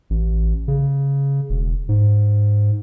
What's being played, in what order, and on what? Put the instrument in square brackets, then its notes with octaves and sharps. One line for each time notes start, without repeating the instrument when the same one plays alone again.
[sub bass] A1
C#3
E1
G#2